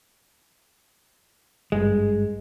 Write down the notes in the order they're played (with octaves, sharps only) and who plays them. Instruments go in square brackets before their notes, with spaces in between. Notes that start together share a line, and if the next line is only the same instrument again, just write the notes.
[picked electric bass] G#1 G2 [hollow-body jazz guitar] G#3